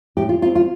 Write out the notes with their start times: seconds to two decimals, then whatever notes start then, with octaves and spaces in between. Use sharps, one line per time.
0.17 A2 G4
0.29 F4
0.42 G3 C4 F4
0.55 F4